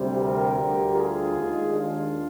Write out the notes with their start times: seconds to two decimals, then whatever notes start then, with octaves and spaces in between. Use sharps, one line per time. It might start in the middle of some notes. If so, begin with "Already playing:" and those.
Already playing: D2 C3 G3 C4
0.18 G4 A#4
0.57 D2 D3 G3
0.95 F4 G#4
1.34 D#2 D#3 G#3
1.73 D4 F4